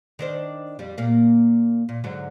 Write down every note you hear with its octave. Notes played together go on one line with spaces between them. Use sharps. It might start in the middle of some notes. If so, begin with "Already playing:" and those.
D#3 D4 C5
F2 G3
A#2 A#3
A#2
G#2 D3 F#3